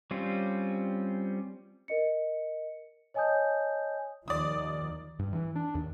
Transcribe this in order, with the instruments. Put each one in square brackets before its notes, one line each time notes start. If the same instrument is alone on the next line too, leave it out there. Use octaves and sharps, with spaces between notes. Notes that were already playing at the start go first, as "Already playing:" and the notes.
[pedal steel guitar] G3 C4 C#4 F4
[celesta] A#4 D#5 C#7
C#5 D#5 G#5 A5 D#6 G6
[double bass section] D#2 D#3 F3 [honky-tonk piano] D5 D#6
[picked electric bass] G2
E3
D4
D#2